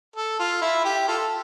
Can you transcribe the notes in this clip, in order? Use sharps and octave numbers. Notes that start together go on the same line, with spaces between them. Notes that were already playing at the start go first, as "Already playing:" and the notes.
A4
F4
E4
G4
F4 A4